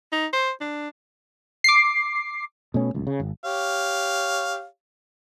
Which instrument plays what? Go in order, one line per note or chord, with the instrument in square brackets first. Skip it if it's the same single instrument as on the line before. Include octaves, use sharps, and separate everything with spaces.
[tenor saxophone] D#4
C5
D4
[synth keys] D6 C7
[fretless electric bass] B2 A3 C#4
D1 C#2
C#3
G#1
[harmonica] G4 C#5 F5